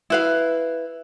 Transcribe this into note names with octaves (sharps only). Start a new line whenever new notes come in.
E4 B4 F5